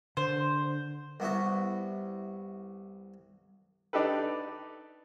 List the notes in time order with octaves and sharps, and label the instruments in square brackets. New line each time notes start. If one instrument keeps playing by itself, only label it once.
[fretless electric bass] D3 [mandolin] C5
[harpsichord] C2 B3 E4 F#4
[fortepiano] D4 D#4 G4 A4 B4